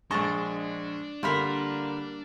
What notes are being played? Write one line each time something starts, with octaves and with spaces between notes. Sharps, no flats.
A#1 G#3 D4 D#5 A5 C#6
D3 G3 A#3 F4 A#4 B5 B6